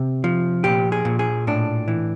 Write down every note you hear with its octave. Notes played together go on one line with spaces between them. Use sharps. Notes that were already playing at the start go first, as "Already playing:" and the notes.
Already playing: C3
F3
A#2 G4
G#4
A#2
G#4
A2 D4
E3